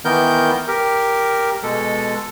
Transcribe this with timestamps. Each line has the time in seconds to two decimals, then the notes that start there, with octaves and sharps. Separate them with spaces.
0.05 D#3 E3 B3 A#4 G6
0.68 G4 A#4
1.63 B2 G#3 A4